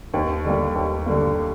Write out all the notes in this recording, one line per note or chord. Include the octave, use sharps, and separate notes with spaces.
D#2
D3 G3 A#3
D#2
D3 G3 A#3